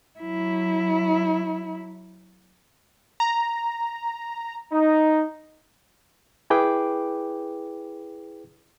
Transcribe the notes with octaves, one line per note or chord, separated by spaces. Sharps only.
F#3 E4
A#5
D#4
E4 G#4 B4 G5 D6